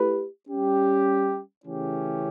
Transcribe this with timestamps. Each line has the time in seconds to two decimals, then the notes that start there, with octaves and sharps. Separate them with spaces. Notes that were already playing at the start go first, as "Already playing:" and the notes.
Already playing: A3 E4 G4 B4
0.49 G3 C#4 G4
1.65 C#3 E3 A3 C#4 G4